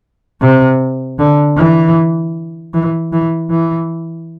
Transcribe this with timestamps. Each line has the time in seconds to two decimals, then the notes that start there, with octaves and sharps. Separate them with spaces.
0.41 C3
1.19 D3
1.57 E3
2.74 E3
3.12 E3
3.50 E3